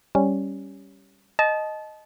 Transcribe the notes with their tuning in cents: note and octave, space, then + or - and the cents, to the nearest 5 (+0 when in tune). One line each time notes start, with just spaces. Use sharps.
G3 +0 C#4 +0
D#5 +0 A5 -25